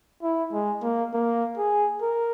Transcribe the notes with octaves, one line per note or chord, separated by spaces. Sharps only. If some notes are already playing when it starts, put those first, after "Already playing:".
E4
G#3
A#3
A#3
G#4
A#4